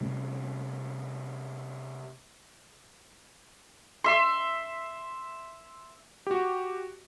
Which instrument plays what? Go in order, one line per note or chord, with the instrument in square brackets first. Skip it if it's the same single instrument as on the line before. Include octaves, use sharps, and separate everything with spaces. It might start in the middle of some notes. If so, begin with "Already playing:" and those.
[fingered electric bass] C3 G3 A3 C#4
[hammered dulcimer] E5 C6
[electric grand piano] F#4 G4